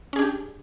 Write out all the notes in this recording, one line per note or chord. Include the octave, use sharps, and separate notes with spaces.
C#4 D4 G4 G#4